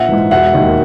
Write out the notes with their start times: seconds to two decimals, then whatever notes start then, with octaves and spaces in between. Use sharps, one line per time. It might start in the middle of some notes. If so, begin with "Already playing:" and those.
Already playing: A#1 E5 F#5
0.09 G#2 E3
0.31 E1 E5 F#5
0.54 D#2 D#3